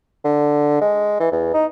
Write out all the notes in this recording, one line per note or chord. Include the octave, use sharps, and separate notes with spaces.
D3
G#3
E3
E2
D#4